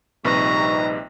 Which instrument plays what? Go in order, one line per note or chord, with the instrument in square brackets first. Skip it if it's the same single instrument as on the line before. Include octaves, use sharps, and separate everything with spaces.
[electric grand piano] A#1 C3 B4 [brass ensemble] G3 D#4 [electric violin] A#5 [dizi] C#6